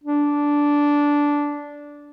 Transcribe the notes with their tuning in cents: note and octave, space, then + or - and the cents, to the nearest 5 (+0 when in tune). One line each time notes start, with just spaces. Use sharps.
D4 -10